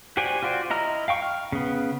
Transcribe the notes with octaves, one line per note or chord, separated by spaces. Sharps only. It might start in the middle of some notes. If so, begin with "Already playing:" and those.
F#4 G4 C5 D5 G#5
F4 F#4 C5 D5
E4 D#5 A#5 F6
F5 G5 C#6
F6
C#3 B3